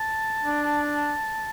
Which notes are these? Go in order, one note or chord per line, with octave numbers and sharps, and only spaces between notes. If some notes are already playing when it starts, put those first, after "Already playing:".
Already playing: A5
D4